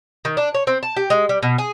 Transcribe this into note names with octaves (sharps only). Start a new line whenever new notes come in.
D#3
D4
C#5
C4
A5
G4
G#3
G3
B2
G#4